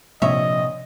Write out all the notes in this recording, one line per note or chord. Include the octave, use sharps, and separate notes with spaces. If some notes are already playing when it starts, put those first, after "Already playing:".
A#1 C3 C#5 D#5 E5